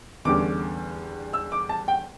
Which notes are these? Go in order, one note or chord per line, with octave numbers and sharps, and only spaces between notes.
E2 D3 G3 C#4 D6
E6
D6
A5
G5